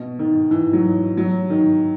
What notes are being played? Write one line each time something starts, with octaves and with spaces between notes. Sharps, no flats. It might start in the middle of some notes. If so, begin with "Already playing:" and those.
Already playing: B2
D#3
E3
F#3
F#3
D#3